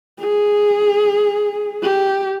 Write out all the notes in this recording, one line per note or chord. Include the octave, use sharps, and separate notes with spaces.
G#4
G4